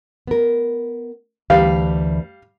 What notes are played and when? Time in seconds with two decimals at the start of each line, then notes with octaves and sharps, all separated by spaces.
0.27 B3 A#4
1.50 D2 E3 G3 B4 F5